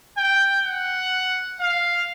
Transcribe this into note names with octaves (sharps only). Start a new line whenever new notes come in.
G5
F#5
F5